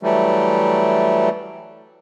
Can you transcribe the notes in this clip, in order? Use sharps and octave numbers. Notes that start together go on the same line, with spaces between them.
E3 F#3 G3 A3